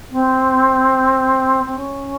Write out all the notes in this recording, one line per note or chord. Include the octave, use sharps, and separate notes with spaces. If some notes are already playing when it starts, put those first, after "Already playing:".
C4
C4
C#4